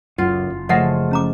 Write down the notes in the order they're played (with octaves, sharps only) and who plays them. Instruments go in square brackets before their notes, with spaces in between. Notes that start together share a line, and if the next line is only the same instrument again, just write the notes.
[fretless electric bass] F#1 C#2 F#2 [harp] F4 [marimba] F#5
[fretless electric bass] F#1
[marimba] C#3 A#6 [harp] F3 G#3 A3 [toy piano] D5 D#5 F#5
[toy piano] C#4 A#5 D6